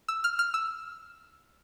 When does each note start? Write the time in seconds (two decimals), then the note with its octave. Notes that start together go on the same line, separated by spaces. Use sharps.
0.08 E6
0.24 F6
0.39 F6
0.54 E6